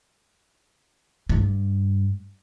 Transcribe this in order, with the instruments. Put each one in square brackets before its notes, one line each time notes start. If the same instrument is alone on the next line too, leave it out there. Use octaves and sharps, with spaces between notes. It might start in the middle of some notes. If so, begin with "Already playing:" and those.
[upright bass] G2